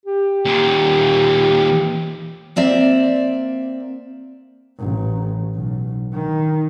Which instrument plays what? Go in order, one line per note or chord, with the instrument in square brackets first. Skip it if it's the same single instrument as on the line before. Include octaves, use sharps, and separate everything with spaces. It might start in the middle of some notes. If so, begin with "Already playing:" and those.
[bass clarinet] G4
[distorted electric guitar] D#2 A#2
[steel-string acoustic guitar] A#3 C4 D5 E5
[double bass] A1
B1
D#3